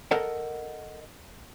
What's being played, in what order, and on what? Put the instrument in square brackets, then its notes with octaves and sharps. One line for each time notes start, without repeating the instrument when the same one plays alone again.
[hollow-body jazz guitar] A4 A#4 D#5 F#5